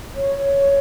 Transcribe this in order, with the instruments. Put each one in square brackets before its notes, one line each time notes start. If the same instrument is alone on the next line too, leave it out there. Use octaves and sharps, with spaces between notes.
[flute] C#5